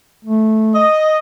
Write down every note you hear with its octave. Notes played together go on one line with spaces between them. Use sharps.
A3
D#5